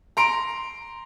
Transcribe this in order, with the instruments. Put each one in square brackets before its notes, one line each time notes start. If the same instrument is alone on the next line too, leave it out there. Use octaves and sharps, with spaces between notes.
[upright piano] A#5 C6 D7